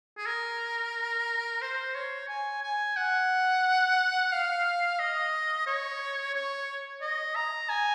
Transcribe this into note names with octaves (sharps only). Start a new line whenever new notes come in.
G#4
A#4
C5
C#5
G#5
G#5
F#5
F5
D#5
C#5
C#5
D#5
A#5
G#5